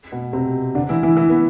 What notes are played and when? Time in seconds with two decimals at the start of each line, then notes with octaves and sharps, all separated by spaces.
0.12 B2 B3
0.33 C3 C4
0.75 D3 D4
0.89 E3 E4
1.03 E3 E4
1.16 E3 E4
1.29 B3